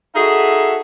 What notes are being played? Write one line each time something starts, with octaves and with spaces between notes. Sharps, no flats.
D#4 F#4 G#4 A4 E5